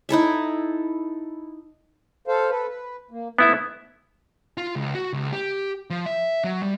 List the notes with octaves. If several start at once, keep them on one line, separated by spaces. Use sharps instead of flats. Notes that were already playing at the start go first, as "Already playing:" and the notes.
D#4 E4 A4 E5
A4 C5 F5
A4 B4
B4
A#3
G#2 A3 B3 E4 E5
F4
C#2
F#4
C#2
G4
F3
E5
F#3
G3